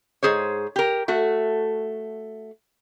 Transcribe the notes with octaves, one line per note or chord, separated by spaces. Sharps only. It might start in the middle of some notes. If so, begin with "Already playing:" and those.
G#2 G#4 C5 C#5
G4 A#4
A3 F#4